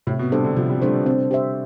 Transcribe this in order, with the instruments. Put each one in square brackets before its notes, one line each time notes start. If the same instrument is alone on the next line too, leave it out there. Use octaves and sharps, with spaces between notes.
[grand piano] A2 [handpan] C3
[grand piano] B2
[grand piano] C3 [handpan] G3 D4 A4 C5
[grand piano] D3
[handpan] C3 [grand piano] F3
[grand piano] G3
[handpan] G3 D4 A4 C5 [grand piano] A3
[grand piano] B3
[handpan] C4 [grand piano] D4
[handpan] G4 C5 E5